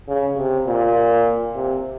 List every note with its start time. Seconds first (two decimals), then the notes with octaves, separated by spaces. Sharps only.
0.08 C#3
0.37 C3
0.67 A#2
1.55 C3